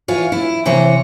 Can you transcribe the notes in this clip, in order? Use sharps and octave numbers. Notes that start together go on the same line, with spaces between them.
E3 F4 C#5
E4
C3 E3 C5 C#5